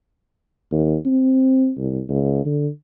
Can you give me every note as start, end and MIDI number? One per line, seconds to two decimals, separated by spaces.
0.71 0.96 39
1.05 1.72 60
1.78 2.02 36
2.09 2.42 37
2.45 2.69 50